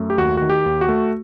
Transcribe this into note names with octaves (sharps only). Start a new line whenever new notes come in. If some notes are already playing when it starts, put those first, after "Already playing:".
Already playing: F#2 A3
G4
D#2 F#4
D#3 F#4
G4
D#2
F#4
A3